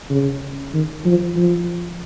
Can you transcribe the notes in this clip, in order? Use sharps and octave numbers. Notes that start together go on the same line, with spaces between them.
C#3
D#3
F3
F3